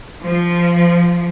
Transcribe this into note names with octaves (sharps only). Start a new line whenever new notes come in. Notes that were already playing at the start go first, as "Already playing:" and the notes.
F3